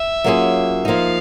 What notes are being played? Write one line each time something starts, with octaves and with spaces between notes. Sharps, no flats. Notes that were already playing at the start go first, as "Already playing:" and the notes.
Already playing: E5
F#3 A#3 C#4 F4 G#4
F3 A#3 D#4 F5